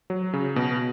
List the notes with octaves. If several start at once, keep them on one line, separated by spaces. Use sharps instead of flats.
F#3
C#3
B2